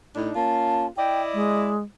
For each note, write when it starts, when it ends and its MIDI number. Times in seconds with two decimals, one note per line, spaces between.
0.15 0.31 45
0.15 0.31 62
0.15 0.31 63
0.35 0.86 58
0.35 0.86 61
0.35 0.86 65
0.35 0.87 81
0.97 1.71 64
0.97 1.71 74
0.97 1.71 75
0.97 1.22 79
1.34 1.83 56